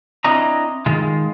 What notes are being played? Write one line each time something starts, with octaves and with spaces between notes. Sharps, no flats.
C4 D4 E4 D#5 A#5
D#3 G#3 F4